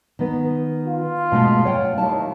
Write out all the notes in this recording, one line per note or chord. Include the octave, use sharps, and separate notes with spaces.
D#3 B3
F4
B2 G#3 A3
C#5 F#5 G5
D#2 E4 G5 A5